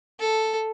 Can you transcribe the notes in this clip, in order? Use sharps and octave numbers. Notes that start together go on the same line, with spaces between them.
A4